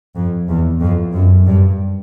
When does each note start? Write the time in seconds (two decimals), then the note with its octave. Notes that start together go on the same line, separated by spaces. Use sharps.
0.16 F2
0.49 E2
0.80 F2
1.13 F#2
1.44 G2